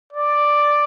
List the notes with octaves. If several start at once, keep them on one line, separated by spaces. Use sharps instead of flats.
D5